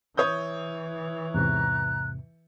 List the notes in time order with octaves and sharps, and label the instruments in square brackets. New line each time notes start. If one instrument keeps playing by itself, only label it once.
[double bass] E3 [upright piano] C#5 D#6 G6
[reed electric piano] E2 G#2 C3 [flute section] A#5 F#6